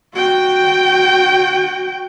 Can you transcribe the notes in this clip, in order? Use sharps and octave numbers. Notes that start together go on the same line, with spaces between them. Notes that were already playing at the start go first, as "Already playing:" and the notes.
F#4 G5